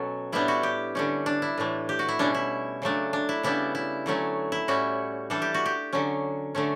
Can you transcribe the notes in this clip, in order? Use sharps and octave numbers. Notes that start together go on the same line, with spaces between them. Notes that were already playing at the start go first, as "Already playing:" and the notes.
Already playing: B2 F#3 C#4 A4
A2 G3 B3 D4 E4
F#4
G4
D3 G3 C#4
D4
E4
A2 E3 A3
G4
F#4
E4
B2 G3 C#4 D4
E4
C#3 F#3 A3 D4
D4
E4
C#3 G3 B3 D4 E4
E4
D3 F#3 A3 C#4
E4
A2 G3 C#4 F#4
E3 G3 D4 A4
G4
F#4
G4
D3 F#3 C#4
D3 A3 C#4